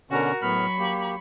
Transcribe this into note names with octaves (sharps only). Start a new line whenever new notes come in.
B2 D3 C#4 F#4 A#4
A2 F#3 B3 B5 C#6 F6
A#3 G4